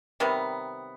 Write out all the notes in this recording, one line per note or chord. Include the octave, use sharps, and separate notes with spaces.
C3 D#3 G3 B3